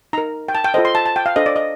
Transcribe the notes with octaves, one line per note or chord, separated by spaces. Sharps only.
D#4 A#4 A#5
G5
A5
G5
F4 A4 C5 D#5
C6
A5
A5
G5
F5
D4 A4 C5 D#5
D5
D#5